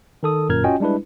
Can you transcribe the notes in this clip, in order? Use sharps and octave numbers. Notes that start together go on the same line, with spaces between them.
D#3 A4 D#6
G1 F#2 A#2 A#4 F6 G#6
C#4 F4 F#4 D#5 G5 G#5
G3 G#3 D4 E4 B4